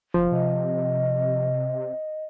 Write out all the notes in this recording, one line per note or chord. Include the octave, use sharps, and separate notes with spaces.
F#1 F3
C3 D#5